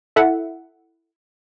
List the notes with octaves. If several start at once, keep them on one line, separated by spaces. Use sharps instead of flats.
E4 A4 E5 F#5